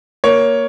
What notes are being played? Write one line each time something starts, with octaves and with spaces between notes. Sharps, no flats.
A#3 C#5